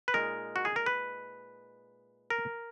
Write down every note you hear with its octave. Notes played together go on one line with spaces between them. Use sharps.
B4
A#2 G#3 D#4 A#4
F#4
G#4
A#4
B4
A#4